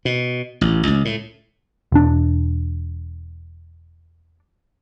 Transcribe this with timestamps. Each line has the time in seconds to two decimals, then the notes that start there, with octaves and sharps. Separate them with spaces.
0.05 B2
0.61 A1
0.87 C#2
1.05 A2
1.92 E1 D4